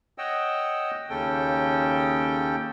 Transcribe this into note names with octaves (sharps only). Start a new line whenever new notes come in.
C#5 D#5 F#5 G5 E6
D#2 C#3 C#4 A4 G5